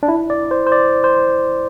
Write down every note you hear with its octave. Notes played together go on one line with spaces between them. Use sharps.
D4
E4
D5
C5
C5
D5
C5